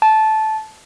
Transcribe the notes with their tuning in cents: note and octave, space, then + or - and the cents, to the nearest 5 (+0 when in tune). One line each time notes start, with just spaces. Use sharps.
A5 -15